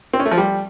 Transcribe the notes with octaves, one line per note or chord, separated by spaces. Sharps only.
C4
C#4
A3
F3
G3